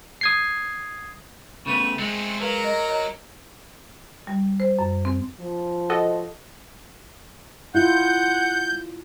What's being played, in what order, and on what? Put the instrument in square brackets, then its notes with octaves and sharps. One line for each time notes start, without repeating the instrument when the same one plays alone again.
[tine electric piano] D#6 G#6 C7
[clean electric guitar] C#3 A3 B3 [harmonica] C4 B5 C#6
[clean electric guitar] G#3 [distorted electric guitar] A3 G#4 [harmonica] C4
[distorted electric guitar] F#3 [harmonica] A#4 [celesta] B4 F5
[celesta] D#5 A#5 A#6
C#5 D#5 A#5
[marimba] G3
C5
F#2
C4
[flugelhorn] F3
[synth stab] F#4 A4 D#5
[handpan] E4 F4 [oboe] F#5 [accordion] G6